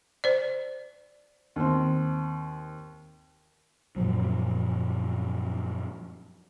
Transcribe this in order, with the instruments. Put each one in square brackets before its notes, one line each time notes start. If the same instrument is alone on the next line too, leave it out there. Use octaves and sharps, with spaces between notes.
[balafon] C5 D5
[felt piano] D#2 C4
[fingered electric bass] F#2 A#2 F3 F#3